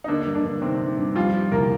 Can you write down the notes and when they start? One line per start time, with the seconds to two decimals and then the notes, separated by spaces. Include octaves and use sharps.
0.04 D#4
0.08 D3 A#3 D4
0.27 G2
0.35 D3 D4
0.45 G2
0.62 C3 D#3 C4
0.80 G2
0.98 G2
1.15 F3 G3 F4
1.34 G3
1.52 C2 A#3 A#4